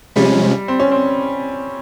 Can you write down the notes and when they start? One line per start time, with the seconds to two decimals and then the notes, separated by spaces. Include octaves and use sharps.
0.16 C3 F3 G3 G#3 C#4
0.68 C4
0.80 C#4
0.91 C4